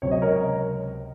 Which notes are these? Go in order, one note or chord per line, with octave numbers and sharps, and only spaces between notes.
C#2 C3 F#3 C4 C#5
D#5
A#4 C#5